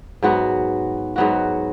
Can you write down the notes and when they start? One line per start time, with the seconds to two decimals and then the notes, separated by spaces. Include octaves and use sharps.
0.23 G#2 F#3 B3 F#4
1.16 G#2 F#3 B3 F#4